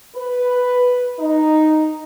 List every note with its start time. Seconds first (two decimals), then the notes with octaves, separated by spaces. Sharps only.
0.16 B4
1.19 D#4